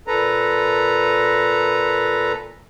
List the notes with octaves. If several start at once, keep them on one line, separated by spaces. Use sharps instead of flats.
A#2 A4 B4 A#5